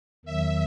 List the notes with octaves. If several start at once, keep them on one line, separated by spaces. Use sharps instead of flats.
E2 D#3 F#3 E5